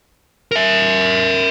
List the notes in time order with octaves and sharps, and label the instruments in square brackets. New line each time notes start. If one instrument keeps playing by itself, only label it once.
[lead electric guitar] A#4 E5